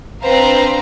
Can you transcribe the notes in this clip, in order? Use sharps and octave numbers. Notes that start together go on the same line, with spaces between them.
C4 D4 B4 C5 F5 A#5